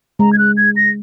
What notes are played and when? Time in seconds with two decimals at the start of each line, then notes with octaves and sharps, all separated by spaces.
0.19 G#3 A#5
0.33 G#6
0.38 F#6
0.57 G#6
0.76 A#6